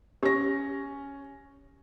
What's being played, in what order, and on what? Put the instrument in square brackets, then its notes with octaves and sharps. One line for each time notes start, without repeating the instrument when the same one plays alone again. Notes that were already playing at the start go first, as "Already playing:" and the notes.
[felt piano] C#4 A#6 [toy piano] G4